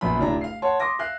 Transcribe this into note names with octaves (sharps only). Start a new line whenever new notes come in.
A#1 F#2 B3 B5
D1 D4 A#5
F5 C7
C#5 F#5 A5 C6
C6 D6 D#6 A#6
E5 F5 F#6 C7